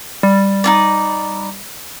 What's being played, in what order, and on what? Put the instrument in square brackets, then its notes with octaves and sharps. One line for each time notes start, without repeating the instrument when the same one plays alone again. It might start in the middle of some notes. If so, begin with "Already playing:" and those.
[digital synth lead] G3
[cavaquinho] D#4 F4 D5